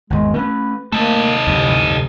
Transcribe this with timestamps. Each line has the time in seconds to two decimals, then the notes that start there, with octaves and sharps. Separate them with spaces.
0.10 G#1 E2 G#3
0.34 A3 C4 C#4 B4
0.92 A3 A#3 D#4 A4
1.47 F1 D2 G2 E3